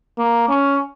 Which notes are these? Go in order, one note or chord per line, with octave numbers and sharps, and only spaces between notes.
A#3
C#4